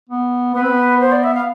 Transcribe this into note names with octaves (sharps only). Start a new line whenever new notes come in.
B3
B3 B4
C4
B3
C5
D5
E5
F5